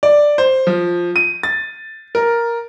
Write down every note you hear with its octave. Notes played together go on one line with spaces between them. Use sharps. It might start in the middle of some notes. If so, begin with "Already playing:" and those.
D5
C5
F3
D#7
A6
A#4